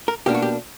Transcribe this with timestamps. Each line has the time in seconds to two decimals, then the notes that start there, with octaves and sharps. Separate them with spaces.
0.08 A#4
0.26 B2 A#3 D4 G4
0.34 F#4
0.42 G4